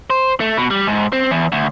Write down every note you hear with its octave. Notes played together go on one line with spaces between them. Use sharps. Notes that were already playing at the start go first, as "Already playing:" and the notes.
C5
A3
B2
G3
G#2
C4
E2
D2